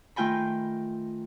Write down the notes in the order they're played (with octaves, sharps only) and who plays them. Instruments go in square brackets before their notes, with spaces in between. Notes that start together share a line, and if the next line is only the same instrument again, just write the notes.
[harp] D#3 A3 F4 G5 G#5 B5